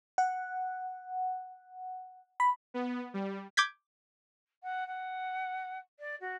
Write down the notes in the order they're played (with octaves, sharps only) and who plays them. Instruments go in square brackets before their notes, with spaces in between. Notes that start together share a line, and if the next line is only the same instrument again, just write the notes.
[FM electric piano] F#5
B5
[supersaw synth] B3
G3
[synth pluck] D6 G6 G#6 B6
[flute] F#5
F#5
D5
F#4